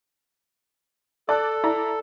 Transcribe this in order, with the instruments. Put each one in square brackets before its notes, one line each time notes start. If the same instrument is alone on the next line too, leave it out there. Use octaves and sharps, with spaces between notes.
[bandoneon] A4 [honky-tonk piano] D5 A5 F#6
[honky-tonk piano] E4 D5 A#5